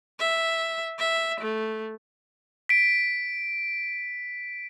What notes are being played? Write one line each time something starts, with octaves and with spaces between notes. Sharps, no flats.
E5
E5
A3
B6 D7